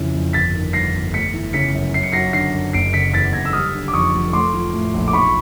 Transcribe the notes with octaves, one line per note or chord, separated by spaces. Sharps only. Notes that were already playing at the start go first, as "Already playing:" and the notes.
Already playing: F2 C#3 E3
F2
G1 A6 B6
D#3
G2 A#6 C7
G1
A3 B6 C#7
E3
C#3 B6 C#7
F#2
F#2 C7
C#7
F#3 A#6 C7
D3 A#6 C7
F#2
F#1 C7 D7
C#3 B6 C#7
E2 A6 B6
F#1 G#6 A#6
E6
G3 D#6 F6
D3
D6
F2 C#6 D#6
F1
A3 C6 D6
F3
A2
A#1
D6
B1 B5 C#6